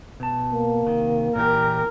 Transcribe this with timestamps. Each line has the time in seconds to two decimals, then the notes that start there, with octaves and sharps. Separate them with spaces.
0.20 B2 A5
0.54 A#3
0.86 C3 D#3
1.36 A#2 E3 G4 A#4